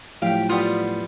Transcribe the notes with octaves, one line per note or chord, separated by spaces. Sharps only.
A2 F3 F#3 G4 F5 G5
G3 B3 F4 D#6